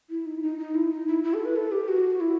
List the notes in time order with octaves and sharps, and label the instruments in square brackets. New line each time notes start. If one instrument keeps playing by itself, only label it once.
[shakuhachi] E4
D#4
E4
D#4
D#4
E4
D#4
E4
E4
A4
B4
A4
G4
F#4
E4